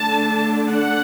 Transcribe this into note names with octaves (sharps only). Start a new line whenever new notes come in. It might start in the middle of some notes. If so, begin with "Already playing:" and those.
Already playing: D3 A3 D4 A5
F#5